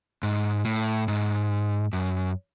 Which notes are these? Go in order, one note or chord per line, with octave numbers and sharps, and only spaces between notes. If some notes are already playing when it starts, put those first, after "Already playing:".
G#2
A2
G#2
F#2